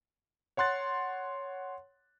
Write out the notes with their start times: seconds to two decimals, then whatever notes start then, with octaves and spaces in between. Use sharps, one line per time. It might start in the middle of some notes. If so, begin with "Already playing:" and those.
0.57 C#5 F#5 C6 F#6 A6